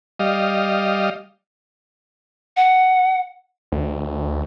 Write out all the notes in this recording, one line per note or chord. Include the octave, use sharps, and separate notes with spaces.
G3 D#5 F5
F#5
D2